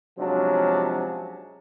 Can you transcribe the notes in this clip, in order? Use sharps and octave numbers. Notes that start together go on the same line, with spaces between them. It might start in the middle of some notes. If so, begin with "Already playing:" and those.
C3 F3 F#3 G#3 C#4 D4